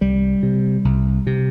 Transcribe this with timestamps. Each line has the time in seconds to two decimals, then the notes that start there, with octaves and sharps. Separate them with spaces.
0.01 C2 G3
0.43 C3
0.85 C2
1.27 C3